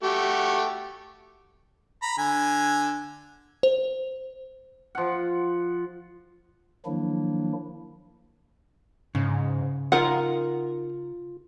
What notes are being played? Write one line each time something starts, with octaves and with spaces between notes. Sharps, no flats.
A3 F#4 G4
A#5 B5
D3 G#5
C5
F3 F#5
D#3 F3 F#3 A#3 D4 E4
G#2 C#3
D#4 F4 A#4 F#5